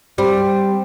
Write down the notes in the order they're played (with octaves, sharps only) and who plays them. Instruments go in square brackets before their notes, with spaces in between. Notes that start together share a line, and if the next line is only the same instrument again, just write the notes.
[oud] G3 [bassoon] C4